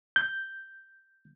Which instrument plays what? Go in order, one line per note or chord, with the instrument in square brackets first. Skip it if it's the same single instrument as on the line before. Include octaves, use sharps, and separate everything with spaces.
[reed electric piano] G6